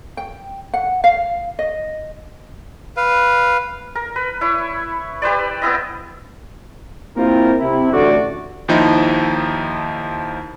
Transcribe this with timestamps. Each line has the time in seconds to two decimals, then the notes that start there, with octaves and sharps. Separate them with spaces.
0.17 G5
0.74 F#5
1.04 F5
1.59 D#5
2.97 B4 F5
3.95 A#4
4.16 B4
4.41 E4 C#5
5.22 G4 B4 C5 D5
5.62 B3 C4 E4 D#5
7.17 A#3 C4 E4 F4 G4 A#4
7.60 C3 E4
7.92 A1 D3 A3 F#4 D5
8.68 D#2 F3 D#4 E4